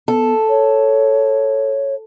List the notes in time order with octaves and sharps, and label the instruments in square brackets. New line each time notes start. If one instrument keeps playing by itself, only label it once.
[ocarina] B3 [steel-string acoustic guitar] A4
[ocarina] C#5